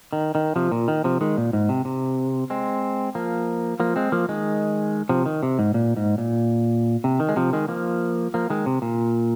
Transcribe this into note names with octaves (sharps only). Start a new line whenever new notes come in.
D#3
D#3
C3 F3
A#2
D#3
C3 F3
D#3 G#3
A#2
G#2
C3
C3
G#3 C4
F3 A#3
F3 A#3
G#3 C4
F3 A#3
D#3 G#3
C3 F3
D#3
C3
G#2
A#2
G#2
A#2
C3
D#3
G#3
C3 F3
D#3 G#3
F3 A#3
F3 A#3
D#3 G#3
C3
A#2